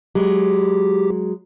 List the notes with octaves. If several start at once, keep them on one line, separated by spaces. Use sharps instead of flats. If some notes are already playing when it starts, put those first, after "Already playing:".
F#3 G#3 G4